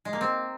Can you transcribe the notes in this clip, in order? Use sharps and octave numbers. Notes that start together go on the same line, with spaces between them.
G#3
A#3
C4